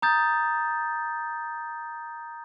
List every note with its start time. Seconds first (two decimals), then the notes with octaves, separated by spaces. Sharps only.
0.02 A#5 D#6 G6 A6